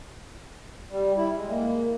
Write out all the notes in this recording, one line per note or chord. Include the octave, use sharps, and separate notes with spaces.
G3
E4
G#3
A#3